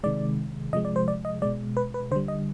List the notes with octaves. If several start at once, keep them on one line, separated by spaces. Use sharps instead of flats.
C3 D#3 G#3 D5
C3 F3 G#3 D#5
D5
C5
D5
D#5
B2 G#3 D5
B4
B4
D3 G3 C5
D#5